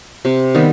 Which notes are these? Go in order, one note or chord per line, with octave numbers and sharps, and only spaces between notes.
C3
D#3 G3 B3